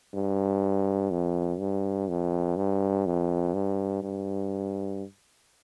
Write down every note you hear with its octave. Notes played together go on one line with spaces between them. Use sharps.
G2
F2
G2
F2
G2
F2
G2
G2